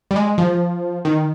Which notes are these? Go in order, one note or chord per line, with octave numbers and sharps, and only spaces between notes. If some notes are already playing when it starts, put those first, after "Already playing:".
G3
G#3
F3
D#3